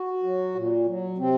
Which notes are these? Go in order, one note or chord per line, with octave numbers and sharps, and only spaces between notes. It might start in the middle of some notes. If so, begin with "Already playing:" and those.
Already playing: F#4
F#3
A#2
F#3
C3 C4